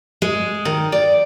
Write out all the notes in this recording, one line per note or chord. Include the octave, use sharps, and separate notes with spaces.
G#3
D#3
D5